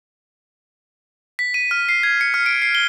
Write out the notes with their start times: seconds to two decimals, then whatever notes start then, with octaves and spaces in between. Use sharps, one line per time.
1.39 B6
1.54 D#7
1.71 F6
1.89 C7
2.03 G#6
2.21 C#7
2.34 F6
2.46 D7
2.62 C7
2.75 G7